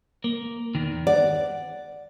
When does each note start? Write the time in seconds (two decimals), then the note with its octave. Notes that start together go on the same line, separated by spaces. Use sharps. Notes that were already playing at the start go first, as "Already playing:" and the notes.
0.24 A#3
0.75 E2 D#3
1.07 D5 F#5